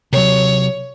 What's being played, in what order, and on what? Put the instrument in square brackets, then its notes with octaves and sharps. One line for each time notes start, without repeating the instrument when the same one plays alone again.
[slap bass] C3 F#3 [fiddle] C#5